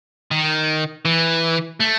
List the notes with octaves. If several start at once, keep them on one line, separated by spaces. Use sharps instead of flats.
D#3
E3
A3